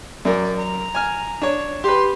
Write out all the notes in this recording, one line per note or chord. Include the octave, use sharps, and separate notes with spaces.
F#2 A#4 D5
A#5
G#5 F6
D4 C#5
G4 B4 C6